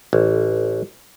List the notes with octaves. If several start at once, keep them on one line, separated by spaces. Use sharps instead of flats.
A1